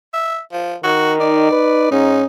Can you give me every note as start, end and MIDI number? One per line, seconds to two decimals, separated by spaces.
0.14 0.40 76
0.52 0.76 53
0.84 1.51 51
0.84 1.13 66
1.20 1.89 63
1.20 1.91 74
1.51 1.86 71
1.91 2.21 44
1.91 2.25 61
1.91 2.25 63